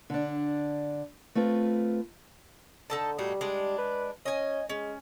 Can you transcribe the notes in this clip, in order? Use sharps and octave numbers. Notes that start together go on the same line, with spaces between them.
D3 D4
A3 C4 F4 B4
D3 D#4 A4 A5
A2 G3 D#4 F#4
G#3 D4
B4
C#4 D#5 G#5
G#3 C#4